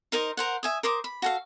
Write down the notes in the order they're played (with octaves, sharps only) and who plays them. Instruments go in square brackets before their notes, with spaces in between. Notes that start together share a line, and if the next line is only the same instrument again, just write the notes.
[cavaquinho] D#4 A#4 C5 D#5
A#4 C5 F#5
E5 G#5 D#6
A#4 C5 D6 D#6
B5
F#4 A4 F5